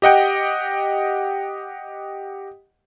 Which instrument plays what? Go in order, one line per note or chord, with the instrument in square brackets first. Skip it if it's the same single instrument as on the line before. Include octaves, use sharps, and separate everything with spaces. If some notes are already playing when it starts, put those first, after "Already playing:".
[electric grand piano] G4 D#5 F#5 G5